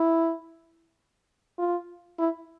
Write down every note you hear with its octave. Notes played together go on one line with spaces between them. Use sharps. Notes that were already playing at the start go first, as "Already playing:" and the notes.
Already playing: E4
F4
E4